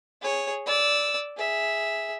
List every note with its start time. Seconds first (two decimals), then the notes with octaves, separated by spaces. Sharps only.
0.21 G#4 C#5
0.66 D5 E6
1.37 G#4 E5